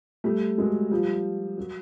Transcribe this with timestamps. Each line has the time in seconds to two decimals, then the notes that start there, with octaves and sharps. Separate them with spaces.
0.24 G3 A3
0.58 F#3 G#3
0.91 F3 G3
1.58 F#3